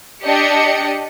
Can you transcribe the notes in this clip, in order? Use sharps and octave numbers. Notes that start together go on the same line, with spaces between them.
D4 G4 D#5 C#7